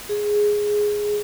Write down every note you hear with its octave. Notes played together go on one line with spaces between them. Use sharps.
G#4